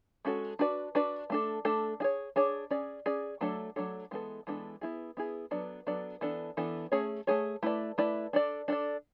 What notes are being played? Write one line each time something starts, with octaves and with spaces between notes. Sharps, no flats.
G#3 C#4 F#4 A4
D4 F#4 B4 D5
D4 F#4 B4 D5
A3 D4 A4
A3 D4 A4
D4 G#4 C#5
D4 G#4 C#5
C#4 G#4 D5
C#4 G#4 D5
F#3 A3 D4 A4 C#5
F#3 A3 D4 A4 C#5
E3 G#3 B3 D4 A4
E3 G#3 B3 D4 A4
B3 E4 G#4
B3 E4 G#4
F#3 B3 D4 A4 D5
F#3 B3 D4 A4 D5
E3 B3 D4 A4
E3 B3 D4 A4
A3 C#4 G#4 C#5
A3 C#4 G#4 C#5
A3 E4 B4 D5
A3 E4 B4 D5
D4 A4 D5
D4 A4 D5